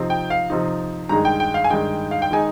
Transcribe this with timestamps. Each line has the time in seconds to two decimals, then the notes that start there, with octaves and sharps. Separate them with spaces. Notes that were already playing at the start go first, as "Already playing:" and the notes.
Already playing: C3 F3 C4 D#4
0.10 G5
0.30 F5
0.50 C3 F3 C4 D#4
1.09 G2 D#3 G#3 D#4 A#5
1.25 G5
1.40 G5
1.54 F5
1.64 G#5
1.70 G2 D#3 G#3 D#4 G5
2.11 F5
2.22 G5
2.31 D#3 G#3 D#4 G#5